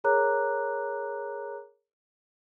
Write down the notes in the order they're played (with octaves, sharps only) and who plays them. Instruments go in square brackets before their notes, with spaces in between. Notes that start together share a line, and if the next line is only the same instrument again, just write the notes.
[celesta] G#4 A#4 C#5 A#5 D6 F#6